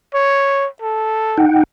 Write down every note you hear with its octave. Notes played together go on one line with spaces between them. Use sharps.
C#5
A4
D#4 F#5 G5